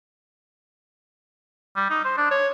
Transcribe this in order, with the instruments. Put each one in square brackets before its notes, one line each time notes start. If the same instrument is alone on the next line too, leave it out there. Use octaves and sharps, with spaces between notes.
[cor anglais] G3
D#4
C5
D4
C#5